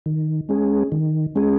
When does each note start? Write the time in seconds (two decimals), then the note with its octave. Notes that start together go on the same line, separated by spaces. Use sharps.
0.06 D#3
0.49 G#3 C#4 G#4
0.92 D#3
1.35 G#3 C#4 G#4